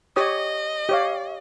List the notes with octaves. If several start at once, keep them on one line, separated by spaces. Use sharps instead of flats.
G4 C#5 D#5 D#6
G4 C#5 F5